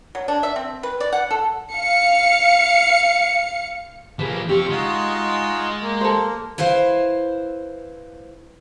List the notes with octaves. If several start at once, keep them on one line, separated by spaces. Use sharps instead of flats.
F#3
D4
E5
C4
B4
D5
F#5
A4
F5 C#7
F3 A#3 G#4 B4
C4 F4 G4 C#6
G#3 D#4 F4 F#4
A#3
A4 C5
E4 B4 C5 F5